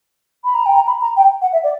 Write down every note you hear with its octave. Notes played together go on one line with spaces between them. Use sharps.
B5
A#5
G5
A#5
B5
A#5
G5
F#5
E5
D5